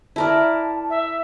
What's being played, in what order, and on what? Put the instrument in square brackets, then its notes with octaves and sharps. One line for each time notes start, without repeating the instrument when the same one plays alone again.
[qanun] E4 A#4 D5 [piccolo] A5
[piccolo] E5